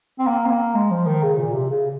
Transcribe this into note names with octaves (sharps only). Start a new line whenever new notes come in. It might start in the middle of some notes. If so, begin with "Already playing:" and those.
C4
A#3
C4
A#3
G#3
F3
D#3
C#3
A#2
C3
C#3